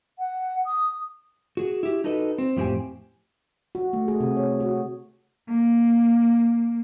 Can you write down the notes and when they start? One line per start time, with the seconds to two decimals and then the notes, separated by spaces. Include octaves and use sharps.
0.19 F#5
0.66 D#6
1.57 F#4 G#4
1.83 E4 G4
2.04 D#4 F#4 A4 B4 D#5
2.38 C4
2.57 F2 A2 C4 G4 C5 G#5
3.75 F#4
3.93 A3
4.08 G#4
4.20 C3
4.37 C#5
4.60 F#4
5.49 A#3